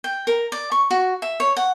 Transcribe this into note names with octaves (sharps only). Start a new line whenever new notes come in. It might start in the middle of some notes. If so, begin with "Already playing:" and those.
G5
A#4
D5
C#6
F#4
E5
C#5
F#5